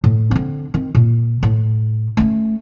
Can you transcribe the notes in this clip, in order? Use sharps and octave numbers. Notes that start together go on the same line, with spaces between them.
A2
D3 C4
D#3 C4
A#2
A2
A3 C#4